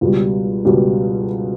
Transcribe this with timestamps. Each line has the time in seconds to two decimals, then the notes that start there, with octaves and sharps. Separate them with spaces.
0.01 C#2 B2 G3
0.65 C#2 B2 G3